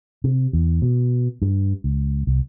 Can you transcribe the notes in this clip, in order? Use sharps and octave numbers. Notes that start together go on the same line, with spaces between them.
C3
E2
B2
G2
C#2
C2